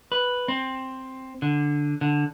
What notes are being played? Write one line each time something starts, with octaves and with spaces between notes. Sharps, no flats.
B4
C4
D3
D3